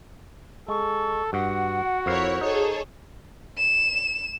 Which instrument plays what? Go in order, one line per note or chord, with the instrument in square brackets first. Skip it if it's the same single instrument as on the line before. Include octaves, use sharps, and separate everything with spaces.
[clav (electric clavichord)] G#3 [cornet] A4 [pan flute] C#6
[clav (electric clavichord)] G2 [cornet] F#4 [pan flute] F#5
[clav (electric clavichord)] F2 F5 [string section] E4 A#4 C#5 [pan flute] C5
[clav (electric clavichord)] D#4 [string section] G#4 A4 C#5
[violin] E7